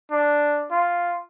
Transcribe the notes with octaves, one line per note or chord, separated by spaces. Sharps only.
D4
F4